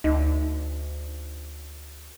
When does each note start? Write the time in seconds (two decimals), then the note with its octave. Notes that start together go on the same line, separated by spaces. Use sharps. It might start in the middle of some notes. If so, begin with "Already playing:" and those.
0.04 D2 D#4